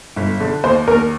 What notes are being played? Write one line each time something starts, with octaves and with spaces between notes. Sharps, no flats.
G1
D3
D#2 C5
D#2 A#4